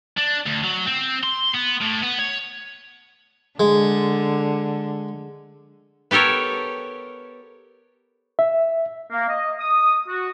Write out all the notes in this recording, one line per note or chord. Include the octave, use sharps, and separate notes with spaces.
D4
D2
F#3
C4
C6
B3
A2
B3
C#5
D3 G#3
B3 G4 A4 A#4 C#5
E5
A#3
D#5
D#6
F#4